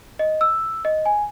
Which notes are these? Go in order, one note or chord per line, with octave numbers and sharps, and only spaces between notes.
D#5
E6
D#5
G#5